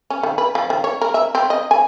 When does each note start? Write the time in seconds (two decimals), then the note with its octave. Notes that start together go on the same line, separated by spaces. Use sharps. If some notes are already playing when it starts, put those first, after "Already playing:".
0.10 C#4
0.23 D#3
0.38 B4
0.55 F3
0.70 D#3
0.84 C#5
1.01 A#4
1.14 E5
1.35 C4
1.50 D#5
1.71 G#5